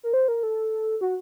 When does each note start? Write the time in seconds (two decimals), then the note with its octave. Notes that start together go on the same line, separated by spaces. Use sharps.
0.03 A#4
0.13 C5
0.28 A#4
0.43 A4
1.01 F#4